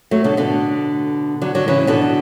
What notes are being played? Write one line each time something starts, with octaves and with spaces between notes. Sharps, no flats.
F#3 A3
B2 D3
B2 D3
D3 F#3
D3 F#3
C#3 E3
B2 D3